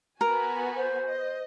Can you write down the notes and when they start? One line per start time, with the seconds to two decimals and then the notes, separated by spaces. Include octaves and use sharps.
0.21 B3 F#4 A#4 G#5
0.76 C5
1.08 D#5